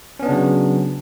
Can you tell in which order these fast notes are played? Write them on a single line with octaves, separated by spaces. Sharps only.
C#4 B3 D4 C#3 F#3